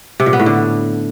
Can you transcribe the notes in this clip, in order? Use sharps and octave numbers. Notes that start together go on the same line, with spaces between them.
C3
A#2
B3
A2
D3